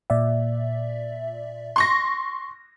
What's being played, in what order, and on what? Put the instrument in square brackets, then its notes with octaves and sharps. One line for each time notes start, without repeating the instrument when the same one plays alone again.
[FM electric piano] A#2 D5 E5
[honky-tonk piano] C6 C#6 A#6